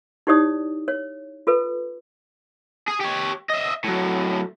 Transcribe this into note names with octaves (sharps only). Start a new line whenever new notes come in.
D#4 E4 G4 C#5 D5 D#6
C#5
F4 A4 B4
G#4
G4 C#5
D#5 E5
A2 F#3